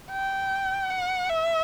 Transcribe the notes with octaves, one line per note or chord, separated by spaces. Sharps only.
G5
F#5
E5